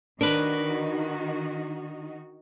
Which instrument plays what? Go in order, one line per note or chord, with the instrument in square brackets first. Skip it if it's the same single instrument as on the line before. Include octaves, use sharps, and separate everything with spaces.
[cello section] D#3 D#4 F#4 [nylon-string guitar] D4 [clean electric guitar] A#4 B4